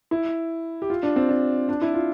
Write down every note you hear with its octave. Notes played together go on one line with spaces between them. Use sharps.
E4
G4
F4
D4
C4
D4
D4
E4
F4